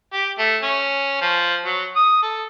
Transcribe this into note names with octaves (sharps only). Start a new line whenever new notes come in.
G4
A3
C#4
F3
F#3
D#6
A4